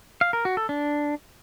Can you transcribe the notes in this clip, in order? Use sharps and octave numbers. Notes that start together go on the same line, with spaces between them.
F5
A#4
F#4
A4
D4